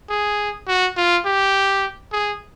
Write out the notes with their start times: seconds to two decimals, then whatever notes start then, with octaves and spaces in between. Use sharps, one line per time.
0.10 G#4
0.68 F#4
0.97 F4
1.26 G4
2.12 G#4